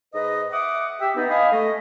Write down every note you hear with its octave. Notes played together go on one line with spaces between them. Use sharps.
G#2 B4 D#5
E5 F#5 D6 D#6
G4 E5
B3 D#4
D#5 F5 G#5 B5 D#6
A3 D#5